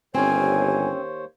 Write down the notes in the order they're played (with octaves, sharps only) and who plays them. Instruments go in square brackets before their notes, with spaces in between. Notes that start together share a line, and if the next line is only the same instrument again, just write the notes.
[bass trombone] G1 [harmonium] D#2 C5 C#5 [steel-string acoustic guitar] C4 C#4 [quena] G#5